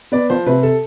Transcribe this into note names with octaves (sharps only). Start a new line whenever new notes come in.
B3 D5
F3 C5
C3 B4
A4